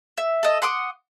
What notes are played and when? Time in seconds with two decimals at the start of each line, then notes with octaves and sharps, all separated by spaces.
0.18 E5
0.43 A4 D#5
0.62 F#5 C6 D6 D#6